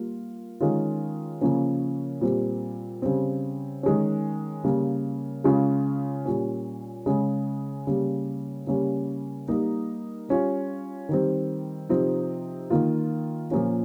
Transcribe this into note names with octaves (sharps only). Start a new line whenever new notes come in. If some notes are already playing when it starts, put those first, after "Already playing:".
Already playing: G3 A#3 F4
D#3 G#3 C#4 F4
C#3 F3 A#3 C#4
A#2 G3 C4
C#3 G3 C4
D#3 G#3 C#4
C#3 G3 A#3
C#3 G#3 C#4 F4
A#2 G3 C#4
C#3 G#3 C#4
C#3 G3 A#3
C#3 G3 A#3 C#4
G3 A#3 D#4
G3 C#4 F4
D#3 G3 C4
C3 F3 C4 D#4
D#3 A#3 F4
A#2 F3 A#3 C#4 F4